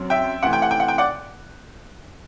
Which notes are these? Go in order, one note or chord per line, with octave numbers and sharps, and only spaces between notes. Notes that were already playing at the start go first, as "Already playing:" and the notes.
Already playing: F#2 F#3 C4
E5 G5
C3 E3 A3 C4 F#5
G5
F#5
G5
F#5
G5
D5 F#5